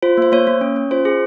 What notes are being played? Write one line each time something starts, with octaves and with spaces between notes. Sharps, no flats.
F4 C5
A#3 C5
A#3 C#5
A#3
C#4
C#4
F4 C5
G#4